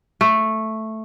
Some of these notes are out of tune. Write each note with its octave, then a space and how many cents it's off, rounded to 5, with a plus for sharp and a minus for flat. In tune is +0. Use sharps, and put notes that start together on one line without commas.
A3 +0